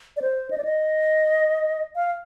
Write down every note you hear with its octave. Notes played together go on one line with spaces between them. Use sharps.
D5
C5
D#5
D5
D#5
F5